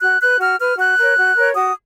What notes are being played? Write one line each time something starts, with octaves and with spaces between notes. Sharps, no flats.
F#4 F#6
B4 F#6
F#4 F6
B4 F6
F#4 F#6
A#4 C#5
F#4
A#4 C#5
F#4 D#6